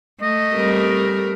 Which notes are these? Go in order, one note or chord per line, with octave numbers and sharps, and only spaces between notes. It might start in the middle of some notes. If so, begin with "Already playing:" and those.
A3 D#5
G3 C4 A#4